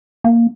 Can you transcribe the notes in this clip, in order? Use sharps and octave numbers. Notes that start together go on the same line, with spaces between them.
A#3